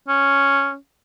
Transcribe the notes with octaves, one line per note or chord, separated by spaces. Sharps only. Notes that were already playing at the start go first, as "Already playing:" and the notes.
C#4